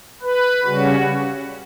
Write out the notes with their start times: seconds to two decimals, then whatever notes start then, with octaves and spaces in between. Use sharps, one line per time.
0.22 B4
0.65 C#3 G3 C#4 F#4